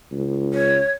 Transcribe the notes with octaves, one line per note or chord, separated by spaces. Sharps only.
C#2
C#5